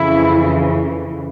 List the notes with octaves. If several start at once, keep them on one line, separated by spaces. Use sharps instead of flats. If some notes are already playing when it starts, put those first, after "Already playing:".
Already playing: F2 C#3 E3 E4